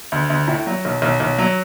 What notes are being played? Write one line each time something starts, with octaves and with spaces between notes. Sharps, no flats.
D2
D2
A2
F#3
B1
B1
B1
F#3